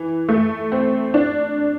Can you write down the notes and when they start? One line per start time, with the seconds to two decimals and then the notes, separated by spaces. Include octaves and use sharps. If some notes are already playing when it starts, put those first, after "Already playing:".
Already playing: E3
0.29 A3
0.72 C4
1.14 D4